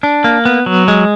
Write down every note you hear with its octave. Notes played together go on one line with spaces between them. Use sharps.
D4
A#3
B3
F#3
G#3